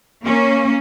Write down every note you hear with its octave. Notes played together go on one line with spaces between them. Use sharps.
A#3 C#4